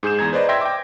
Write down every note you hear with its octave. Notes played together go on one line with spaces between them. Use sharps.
G#2 G#4 G6 E7
E2 A#5 G#6
B4 C5 D5 D#5
E5 G5 C6 G#6 A#6
G5 D6